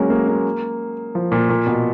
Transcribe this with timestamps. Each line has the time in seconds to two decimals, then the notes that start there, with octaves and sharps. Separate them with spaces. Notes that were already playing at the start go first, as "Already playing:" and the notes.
Already playing: F#3 G#3 A#3 C#4
0.10 A#3
0.28 A#3
1.15 F3
1.32 A#2
1.49 A#2
1.67 B2